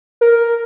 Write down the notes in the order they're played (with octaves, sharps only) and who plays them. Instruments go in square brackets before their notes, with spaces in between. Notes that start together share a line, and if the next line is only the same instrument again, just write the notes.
[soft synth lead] A#4